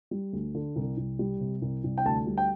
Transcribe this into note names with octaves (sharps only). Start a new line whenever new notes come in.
G3
D2
D3
C2
C2
G3
C3
C2
C2
G5
D2 A5
G3
G5